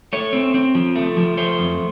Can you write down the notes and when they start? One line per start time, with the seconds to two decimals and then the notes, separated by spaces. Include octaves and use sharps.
0.13 A3 C#5
0.33 C4
0.54 C4
0.75 F3
0.96 A3
1.17 F3
1.37 A3 C5
1.59 F2